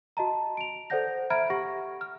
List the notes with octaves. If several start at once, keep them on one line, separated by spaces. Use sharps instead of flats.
F#4 D#5 A5 A#5
D7 F7
A4 C5 D5 F#5 G6 A#6
E5 A#5 B5 F6 G#6 D7
G4 F#5 C#6 A#6
F6